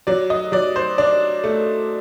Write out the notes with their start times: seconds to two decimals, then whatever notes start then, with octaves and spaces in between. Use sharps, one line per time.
0.07 F#3 D5
0.30 D#5
0.52 F#3 D5
0.76 C5
0.98 D4 D5
1.44 A3